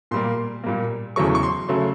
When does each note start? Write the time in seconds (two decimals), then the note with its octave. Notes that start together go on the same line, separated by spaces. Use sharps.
0.11 A#2 G3 A#3 C6
0.64 A#2 G3 A#3
1.16 E2 C#3 F#3 A3 C#6
1.35 C#6
1.43 C6
1.69 C#3 F#3 A3